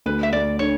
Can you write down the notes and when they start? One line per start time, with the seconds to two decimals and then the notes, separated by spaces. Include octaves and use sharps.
0.06 D2 B4
0.23 E5
0.33 D2 D5
0.59 D3 C#5